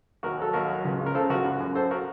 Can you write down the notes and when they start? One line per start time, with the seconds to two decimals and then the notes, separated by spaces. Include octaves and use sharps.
0.23 D#2 F#4 A#4
0.39 F#3 A4
0.53 D#2 F#4 A#4
0.69 F#3
0.85 C#2
1.00 C#3
1.06 A#4
1.14 C#3 A4 C5
1.29 C#2 F#4 A#4
1.45 F#2
1.60 F#2
1.75 F#2 A4 C5
1.91 F#4 A#4